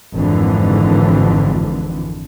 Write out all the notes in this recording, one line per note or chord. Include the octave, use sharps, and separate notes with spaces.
G#1 F2 D3 E3